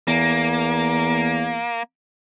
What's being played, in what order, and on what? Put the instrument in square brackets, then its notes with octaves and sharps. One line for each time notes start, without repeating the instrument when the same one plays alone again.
[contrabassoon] E2 [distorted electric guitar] A#3